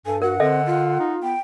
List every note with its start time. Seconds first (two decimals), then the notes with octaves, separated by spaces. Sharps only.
0.06 G2 A4 G#5
0.22 F#4 A#4 F#5
0.40 D3 C4 A4 D#5 E5
0.66 F4
1.00 D#4
1.23 B3 G5